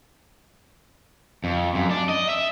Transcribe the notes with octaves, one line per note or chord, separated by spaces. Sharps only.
F2
F#2
D4
D#5
E5